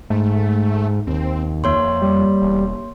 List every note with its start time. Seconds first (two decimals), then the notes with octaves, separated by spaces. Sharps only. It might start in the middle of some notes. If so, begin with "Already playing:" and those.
0.10 G#2 A3
1.07 D#2 C4
1.64 F2 A#3 C#5 C6
2.02 G3
2.42 E1